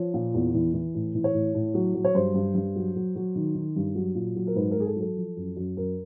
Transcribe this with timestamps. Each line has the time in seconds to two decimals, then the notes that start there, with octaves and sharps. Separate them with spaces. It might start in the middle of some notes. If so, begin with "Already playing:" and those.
Already playing: F3 C#5
0.14 A#2
0.34 E2
0.55 E3
0.74 E3
0.95 A2
1.15 E3
1.24 C#5
1.34 A2
1.55 A2
1.74 F#3
1.95 F#3
2.04 C#5
2.15 G2 C5
2.34 G2
2.55 G2
2.76 F#3
2.96 F#3
3.15 F#3
3.35 D#3
3.55 D#3
3.76 G2
3.95 F#3
4.15 A#2
4.36 F#3
4.47 A#4
4.56 G#2 B4
4.71 A#4
4.77 G#2 G#4
4.86 A4
4.96 F#3
5.01 A4
5.17 F3
5.37 F#2
5.56 F#2
5.77 F#2 A#4